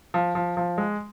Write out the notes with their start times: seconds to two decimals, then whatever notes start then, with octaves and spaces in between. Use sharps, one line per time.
0.14 F3
0.35 F3
0.57 F3
0.78 G#3